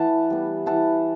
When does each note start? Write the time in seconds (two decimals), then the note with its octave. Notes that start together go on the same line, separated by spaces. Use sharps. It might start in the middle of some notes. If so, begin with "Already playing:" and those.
Already playing: E3 F#5 A5
0.30 G3 B3
0.66 E3 F#5 A5